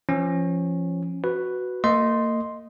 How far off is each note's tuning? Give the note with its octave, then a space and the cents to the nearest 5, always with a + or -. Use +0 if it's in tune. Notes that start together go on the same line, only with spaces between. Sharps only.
F3 -25 C#4 -15
F#4 +0 B4 +0
A#3 -35 D#5 +0 C6 +0